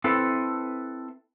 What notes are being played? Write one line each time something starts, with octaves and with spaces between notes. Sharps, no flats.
C4 E4 A4 B4